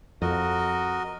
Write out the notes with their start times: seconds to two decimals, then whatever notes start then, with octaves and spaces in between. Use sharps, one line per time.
0.22 F2 F#4 A#4 D#5